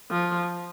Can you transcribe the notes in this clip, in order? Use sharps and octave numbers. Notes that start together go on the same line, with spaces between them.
F3